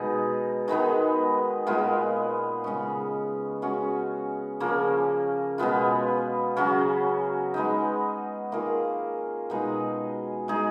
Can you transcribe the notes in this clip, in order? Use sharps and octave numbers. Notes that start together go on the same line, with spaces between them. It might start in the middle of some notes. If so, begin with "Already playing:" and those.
Already playing: B2 G#3 D#4 G#4
D#3 G#3 B3 D#4
A#2 G#3 B3 F4
C#3 G#3 C#4
G#3 C#4 F#4
C#3 F3 A#3 C#4
B2 G#3 B3 F4
C#3 F#3 C#4 F#4
G#3 B3 D#4
D#3 A#3 F4 G#4
B2 G#3 D#4 G#4
G#3 D#4 G#4